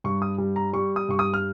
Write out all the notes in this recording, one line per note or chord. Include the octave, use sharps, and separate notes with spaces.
G2 C#6
D#6
G3
A#5
G3 C#6
D#6
G2 C#6
D#6
F6